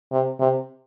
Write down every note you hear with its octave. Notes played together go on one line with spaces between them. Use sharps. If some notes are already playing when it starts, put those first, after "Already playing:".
C3
C3